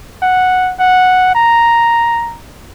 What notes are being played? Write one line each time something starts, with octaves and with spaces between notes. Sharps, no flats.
F#5
F#5
A#5